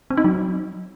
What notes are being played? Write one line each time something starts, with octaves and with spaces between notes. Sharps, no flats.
C4
D#4
F#3